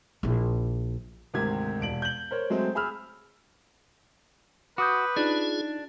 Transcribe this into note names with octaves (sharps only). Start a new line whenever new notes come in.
A#1 E4
D2 G#2 C3 D#3 G4 G#6
E1 D7 F#7
G6 F#7
A#4 C5 C#5
F#3 G#3 A3 C4
G#4 B5 E6 F6
F#4 B4 D6 D#6 G6
D4 D#4 F4 G#4